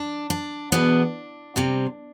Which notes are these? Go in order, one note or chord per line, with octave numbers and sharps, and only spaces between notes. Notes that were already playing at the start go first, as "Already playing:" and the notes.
Already playing: D4
D4
E2 B2 B3 D4
C3 G3 C4